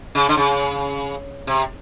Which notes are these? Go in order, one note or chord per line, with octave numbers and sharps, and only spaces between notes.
C#3
D3
C#3
C3